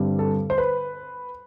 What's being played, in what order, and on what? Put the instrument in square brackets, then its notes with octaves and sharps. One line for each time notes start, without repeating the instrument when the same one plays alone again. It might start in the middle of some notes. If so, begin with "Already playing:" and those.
Already playing: [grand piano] G2 D3 G3 C4
A4
C5
B4